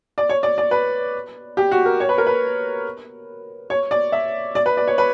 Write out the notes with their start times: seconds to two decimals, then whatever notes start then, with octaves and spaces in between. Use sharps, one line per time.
0.18 D5
0.29 C#5
0.43 D5
0.58 D5
0.71 B4
1.57 G4
1.71 F#4
1.85 A#4
2.00 C#5
2.09 B4
2.18 A#4
2.27 B4
3.70 C#5
3.91 D5
4.12 E5
4.55 D5
4.66 B4
4.77 D5
4.87 C#5
4.98 B4